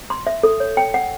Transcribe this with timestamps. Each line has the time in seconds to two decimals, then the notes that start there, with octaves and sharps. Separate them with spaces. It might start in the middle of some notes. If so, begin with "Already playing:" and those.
0.10 C6
0.27 E5
0.43 A4
0.60 C#5
0.77 G5
0.94 F#5